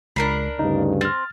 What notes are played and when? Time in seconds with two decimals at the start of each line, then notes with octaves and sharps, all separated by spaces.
0.16 C#2 D4 A#4 B5 C7
0.59 D2 G2 C#3 D#4
1.01 C4 F6 A6